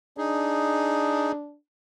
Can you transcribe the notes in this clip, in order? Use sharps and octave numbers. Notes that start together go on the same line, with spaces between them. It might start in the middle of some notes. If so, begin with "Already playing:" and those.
D4 D#4 G#4